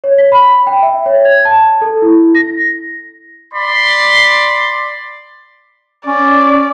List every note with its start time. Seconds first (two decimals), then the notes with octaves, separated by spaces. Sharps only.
0.04 C#5
0.18 B6
0.32 B5
0.67 G5
0.82 E5
1.06 C#5
1.25 G#6
1.45 A5
1.82 A4
2.02 E4
2.35 A#6
3.54 D5 B5 C6
6.06 C#4 D5